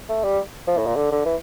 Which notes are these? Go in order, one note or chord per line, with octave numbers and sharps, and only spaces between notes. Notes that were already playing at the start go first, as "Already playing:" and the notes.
A3
G3
F3
A2
A#2
D3
D3
E3